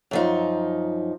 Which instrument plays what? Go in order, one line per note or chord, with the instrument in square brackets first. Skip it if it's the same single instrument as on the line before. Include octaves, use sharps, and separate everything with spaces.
[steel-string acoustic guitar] F#2 F3 D#4